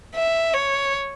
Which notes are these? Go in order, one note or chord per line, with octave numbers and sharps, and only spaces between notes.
E5
C#5